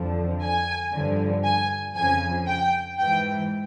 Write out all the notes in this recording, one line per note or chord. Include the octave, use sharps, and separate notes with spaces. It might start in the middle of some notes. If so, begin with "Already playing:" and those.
Already playing: F2 D3 F3
G#5
G2 D3 F3
G#5
F2 C#3 F3 G#5
G5
G#2 E3 G5